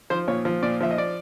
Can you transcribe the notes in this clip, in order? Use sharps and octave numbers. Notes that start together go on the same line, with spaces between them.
F3 C5
A#2 C#5
F3
A#2 D5
F3 E5
D#5
D5